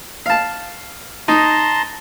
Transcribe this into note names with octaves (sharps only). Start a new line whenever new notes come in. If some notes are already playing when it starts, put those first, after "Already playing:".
F5 A5
D#4 A5 A#5 C6